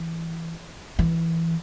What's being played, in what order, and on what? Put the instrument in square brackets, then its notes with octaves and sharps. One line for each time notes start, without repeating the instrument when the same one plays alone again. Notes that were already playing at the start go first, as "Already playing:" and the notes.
Already playing: [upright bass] E3
E3